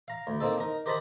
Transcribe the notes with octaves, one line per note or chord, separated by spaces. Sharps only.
F5 A#5
D2
A#3 C4 D#4 A4
D#4 A#4
G4 A#4 C5 D#5 A5 B5